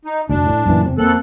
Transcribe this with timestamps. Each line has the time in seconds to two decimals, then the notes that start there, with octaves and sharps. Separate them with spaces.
0.05 D#4
0.29 F1 D2 D4
0.46 A2
0.66 F#2 A#2 E3
0.85 F1 C3 C4
0.98 F2 A#3 C4 A4 F#6